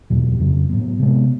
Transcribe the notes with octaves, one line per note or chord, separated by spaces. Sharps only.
E2 B2 F#3
F2 C#3 F#3
A2 F#3 B3
C3 F3 G#3 B3